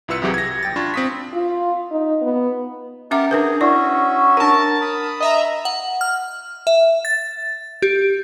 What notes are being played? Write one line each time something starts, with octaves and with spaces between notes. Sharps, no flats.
C2 E4 F4 B4 E6 C#7
C2 C3 E3 F#3 G4 G#4
G#6 A#6
A#1 G5 A6
D4 F4 B5 C#6
C4 D#6 B6
F4
D#4
B3
C#4 G4 A#4 E5 F#5 D6
D4 G#4 A#4 B4
C#4 E4 F#4 D5 E5
D4 A#4 F#5 A5
B5 D#6
D#5 E5 A#5
F#5
F6
E5
A6
G4